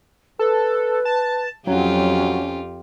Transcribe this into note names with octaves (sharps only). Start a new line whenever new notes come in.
A4 B4
A5
F2 F#3 C#4 F4 G4